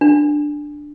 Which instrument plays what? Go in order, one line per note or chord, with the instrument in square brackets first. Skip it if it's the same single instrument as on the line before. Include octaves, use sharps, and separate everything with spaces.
[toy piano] D4